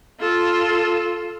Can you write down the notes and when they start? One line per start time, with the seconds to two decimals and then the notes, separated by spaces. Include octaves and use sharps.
0.20 F4 A4